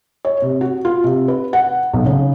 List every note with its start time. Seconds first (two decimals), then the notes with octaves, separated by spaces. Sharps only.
0.25 C#5
0.42 C3
0.61 F#4
0.85 F4
1.04 C3
1.28 B4
1.53 F#5
1.93 B1
2.06 C#3